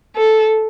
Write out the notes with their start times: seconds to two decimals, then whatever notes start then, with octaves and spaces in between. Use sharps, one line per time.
0.16 A4